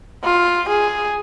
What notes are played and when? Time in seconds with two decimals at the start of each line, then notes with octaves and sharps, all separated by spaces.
0.24 F4
0.69 G#4